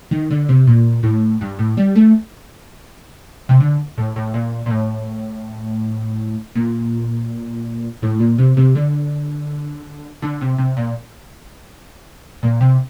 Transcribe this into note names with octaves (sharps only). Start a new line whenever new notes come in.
D#3
D3
C3
A#2
A2
G2
A2
G3
A3
C3
D3
A2
A2
A#2
A#2
A2
A#2
A2
A#2
C3
C3
D3
D3
C3
C3
A#2
A#2
C3